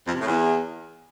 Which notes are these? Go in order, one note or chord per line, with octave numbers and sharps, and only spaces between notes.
F2
C3
A2
E2